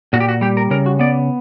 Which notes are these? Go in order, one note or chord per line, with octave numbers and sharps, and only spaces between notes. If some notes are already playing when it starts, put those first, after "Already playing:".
A#2 F#4
G4
F#4
G3 G4
A#4
C#3 A#4
F#4
B3 D5